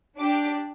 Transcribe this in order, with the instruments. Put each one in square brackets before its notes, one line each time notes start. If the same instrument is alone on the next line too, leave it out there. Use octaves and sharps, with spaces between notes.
[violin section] D4 G4 D6